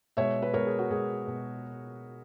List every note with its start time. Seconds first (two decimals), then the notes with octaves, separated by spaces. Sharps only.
0.17 B2 G#3 C#5 E5
0.43 B4
0.54 B2 G#3 A#4 C#5
0.66 G#4
0.79 F#4
0.90 B2 G#3 G#4
1.26 B2 G#3